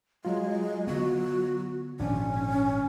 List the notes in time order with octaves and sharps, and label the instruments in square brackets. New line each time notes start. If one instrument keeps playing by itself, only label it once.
[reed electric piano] F#3 F4 [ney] G#3
[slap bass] D3 B3 [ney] F#4
[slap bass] G#1 A#2 F3 [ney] C#4 [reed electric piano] D4